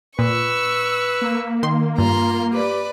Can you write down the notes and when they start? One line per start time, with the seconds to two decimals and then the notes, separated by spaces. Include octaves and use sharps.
0.19 A#2 B4 C#6 E6
1.22 A#3
1.63 D#3 C6
1.98 G2 F4 A#5 C6
2.53 G4 B4 D5